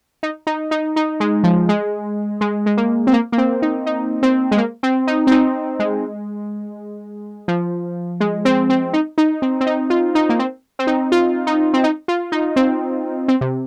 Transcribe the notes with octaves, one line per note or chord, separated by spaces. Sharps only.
D#4
D#4
D#4
D#4
G#3
F3
G#3
G#3
G#3
A#3
C4
A#3
A#3
C4
D#4
D#4
C4
G#3
A#3
C4
D#4
C4
D#4
G#3
F3
G#3
C4
C4
D#4
D#4
C4
C4
D#4
F4
D#4
A#3
C4
C4
D#4
F4
D#4
C4
D#4
F4
D#4
C4
C4
C3